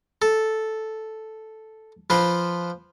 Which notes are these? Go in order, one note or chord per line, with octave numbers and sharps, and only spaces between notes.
A4
F3 B4 C5